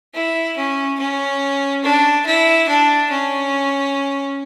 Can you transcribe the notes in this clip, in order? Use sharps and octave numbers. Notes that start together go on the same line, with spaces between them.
E4
C#4
C#4
D4
E4
D4
C#4